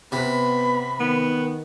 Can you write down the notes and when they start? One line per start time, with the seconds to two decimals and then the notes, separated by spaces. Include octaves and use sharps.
0.12 C3 B3 B5
1.00 D#3 B3